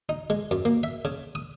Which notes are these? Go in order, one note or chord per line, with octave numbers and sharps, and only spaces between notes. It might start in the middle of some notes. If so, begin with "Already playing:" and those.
D#4
G#3
F#2
A#3
E5
C#3
D#6